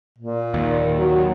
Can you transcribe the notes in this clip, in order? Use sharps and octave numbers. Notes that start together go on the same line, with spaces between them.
A#2
D#2
F#3